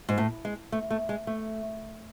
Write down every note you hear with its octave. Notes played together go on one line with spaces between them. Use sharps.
G#2
A2
G#3
A3
A3
G#3
A3